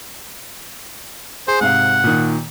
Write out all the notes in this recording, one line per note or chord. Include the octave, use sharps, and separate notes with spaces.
G#4 C5
G#2 C3 F5 F#5
A#2 D#3